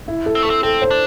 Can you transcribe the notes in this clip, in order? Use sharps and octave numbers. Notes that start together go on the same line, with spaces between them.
E4
A4
C4
A3 A4
C4
C4 A4
C5
D4